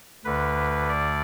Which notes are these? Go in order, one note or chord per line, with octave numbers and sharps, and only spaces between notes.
D2 D3 B4
D5